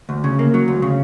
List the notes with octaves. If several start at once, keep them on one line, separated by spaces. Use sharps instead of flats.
D2
C#3
A#3
F#3
D2
C#3